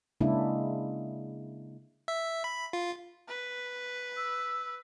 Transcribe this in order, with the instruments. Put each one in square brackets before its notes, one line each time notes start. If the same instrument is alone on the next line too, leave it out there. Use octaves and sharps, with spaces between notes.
[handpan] C#3 G#3 A#3 D4 E4
[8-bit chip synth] E5
B5
F4
[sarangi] B4
[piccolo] E6